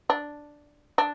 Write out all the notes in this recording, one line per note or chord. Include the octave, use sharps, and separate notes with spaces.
D4
D4